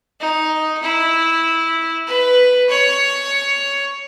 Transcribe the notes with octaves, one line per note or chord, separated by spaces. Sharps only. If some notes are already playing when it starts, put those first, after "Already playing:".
D#4
E4
B4
C#5